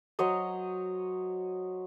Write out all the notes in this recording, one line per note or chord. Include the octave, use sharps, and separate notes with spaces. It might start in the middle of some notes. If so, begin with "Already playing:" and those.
F#3 C5 C#5 D#5